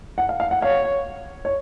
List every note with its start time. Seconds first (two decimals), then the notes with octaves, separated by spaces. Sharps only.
0.18 F#5
0.29 F5
0.40 F5
0.51 F#5
0.62 C#5 F5
1.45 C#5